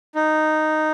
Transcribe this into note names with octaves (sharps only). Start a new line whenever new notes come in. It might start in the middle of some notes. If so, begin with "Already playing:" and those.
D#4